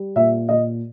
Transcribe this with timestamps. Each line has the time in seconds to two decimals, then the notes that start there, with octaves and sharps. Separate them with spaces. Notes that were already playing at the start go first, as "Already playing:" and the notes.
Already playing: G3
0.16 A#2 E5
0.49 A#2 D#5